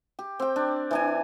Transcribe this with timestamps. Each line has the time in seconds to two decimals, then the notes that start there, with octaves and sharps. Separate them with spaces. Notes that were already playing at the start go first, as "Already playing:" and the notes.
0.19 G4
0.40 C4 G5
0.56 D4
0.91 E3 D4 G#5